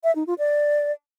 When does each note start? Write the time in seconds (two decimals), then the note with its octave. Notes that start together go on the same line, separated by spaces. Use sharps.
0.04 E5
0.15 D#4
0.27 F4
0.38 D5